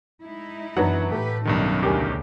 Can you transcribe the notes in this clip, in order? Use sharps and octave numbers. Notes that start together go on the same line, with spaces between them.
G#3 D#4 E4
F#2 E3 F#3 B3 D4 F#5 A#5
A2 A3 G4 B4
B1 G2 D#3 F#3 C#4 D#4
D2 C#3 G4 A#4 G#5